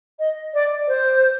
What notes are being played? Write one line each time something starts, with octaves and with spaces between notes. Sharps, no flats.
D#5
D5
C5